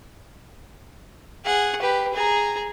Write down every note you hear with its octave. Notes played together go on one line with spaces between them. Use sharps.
G#4 F#5
G4 B4
G#4 A#5